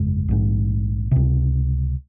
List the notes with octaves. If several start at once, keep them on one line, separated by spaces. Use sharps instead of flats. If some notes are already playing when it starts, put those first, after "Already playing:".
Already playing: G1 F2 C#3 G#3
A#1 G#2
C#2 C3